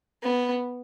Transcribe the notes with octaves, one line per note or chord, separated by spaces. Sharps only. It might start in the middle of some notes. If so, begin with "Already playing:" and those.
B3